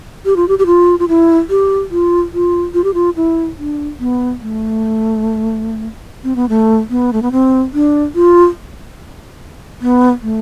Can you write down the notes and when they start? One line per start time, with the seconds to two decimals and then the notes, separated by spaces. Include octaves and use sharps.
0.25 G4
0.36 F4
0.48 G4
0.59 G4
0.66 F4
0.99 F4
1.08 E4
1.50 G4
1.91 F4
2.34 F4
2.74 F4
2.84 G4
2.94 F4
3.16 E4
3.58 D4
4.00 B3
4.41 A3
6.24 C4
6.36 B3
6.49 A3
6.90 B3
7.13 A3
7.22 B3
7.32 C4
7.74 D4
8.15 F4
9.81 B3
10.22 A3